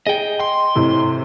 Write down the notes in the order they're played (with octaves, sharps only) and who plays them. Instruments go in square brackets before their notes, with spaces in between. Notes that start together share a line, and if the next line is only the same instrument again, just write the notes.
[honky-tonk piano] G#4 [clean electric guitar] D#5 G5
[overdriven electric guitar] C6
[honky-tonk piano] A2 C3 E3